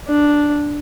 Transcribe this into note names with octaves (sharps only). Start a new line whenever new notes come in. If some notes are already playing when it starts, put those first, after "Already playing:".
D4